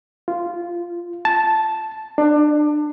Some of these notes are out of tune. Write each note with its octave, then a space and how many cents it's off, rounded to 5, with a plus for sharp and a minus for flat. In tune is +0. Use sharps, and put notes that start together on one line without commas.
F4 -10
A5 -5
D4 +25